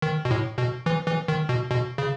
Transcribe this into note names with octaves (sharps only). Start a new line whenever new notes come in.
D#3
B2
A2
B2
E3
E3
D#3
B2
B2
C#3